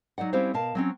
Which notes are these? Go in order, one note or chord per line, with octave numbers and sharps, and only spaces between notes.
F#3 D#4 D5 F#5
G3 C4 C#4 E4 C5 F5
B2 A#4 F5 A5
F#3 C4 C#4